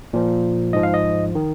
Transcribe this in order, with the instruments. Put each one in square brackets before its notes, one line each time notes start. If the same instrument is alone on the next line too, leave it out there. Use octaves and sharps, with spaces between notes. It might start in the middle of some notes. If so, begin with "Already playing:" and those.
[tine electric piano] A#2 F3
G#2 F3 D#5
F5
D#5
D#3